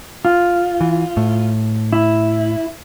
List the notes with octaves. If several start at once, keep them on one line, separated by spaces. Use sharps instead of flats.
F4
E3
A2
E4